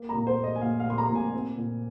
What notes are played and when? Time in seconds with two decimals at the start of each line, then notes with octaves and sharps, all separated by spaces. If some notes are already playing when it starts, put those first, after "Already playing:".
Already playing: A#3
0.09 A#5
0.14 A#2
0.27 C5
0.39 A#3 D#5
0.56 G#5
0.61 A#2 F5
0.80 F5
0.86 A#2 C6
0.98 A#5
1.09 A#2
1.15 G#5
1.34 C4
1.57 A#2